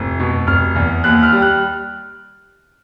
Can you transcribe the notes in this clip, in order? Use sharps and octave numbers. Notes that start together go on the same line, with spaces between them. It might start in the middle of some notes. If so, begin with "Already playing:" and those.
Already playing: F1 A2
B2
F1 F6
E2
D#2 F#6
F6
G3
F#6